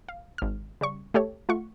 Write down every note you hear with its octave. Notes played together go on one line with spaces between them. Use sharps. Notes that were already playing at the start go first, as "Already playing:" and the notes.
F5
G#1 F6
C#3 G3 C#6
A3 G4 A4 C#5
A3 F4 F#5 C#6